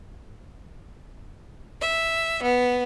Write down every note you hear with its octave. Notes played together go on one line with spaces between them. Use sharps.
E5
B3